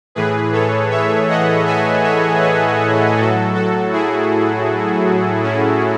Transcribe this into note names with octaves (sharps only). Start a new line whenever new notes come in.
A2 E3 G#4 B4
A4 C#5
C#5 E5
D#5 F#5
E5 G#5
C#5 E5
G#4 B4
A2 F#3 F#4 A4
F#4 A4
E4 G#4
C#4 E4